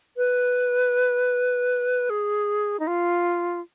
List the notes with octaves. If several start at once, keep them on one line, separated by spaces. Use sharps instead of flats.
B4
G#4
D#4
F4